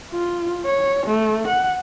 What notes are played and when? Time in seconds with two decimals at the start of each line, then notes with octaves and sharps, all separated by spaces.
0.12 F4
0.66 C#5
1.06 A3
1.47 F#5